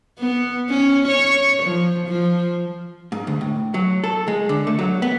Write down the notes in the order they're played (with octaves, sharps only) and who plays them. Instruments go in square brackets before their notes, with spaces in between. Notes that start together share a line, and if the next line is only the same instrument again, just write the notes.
[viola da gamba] B3
C#4
C#5
F3
F3
[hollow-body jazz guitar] G#2
D2
A2
F#3
A4
G#3
D3
A3
F#3
B3